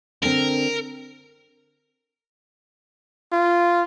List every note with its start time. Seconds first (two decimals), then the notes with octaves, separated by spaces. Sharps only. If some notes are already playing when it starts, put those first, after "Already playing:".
0.23 D3 C4 A#4
3.32 F4